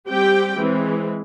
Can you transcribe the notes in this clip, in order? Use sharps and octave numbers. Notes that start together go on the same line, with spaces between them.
G3 C4 G4 G5
E3 G#3 C4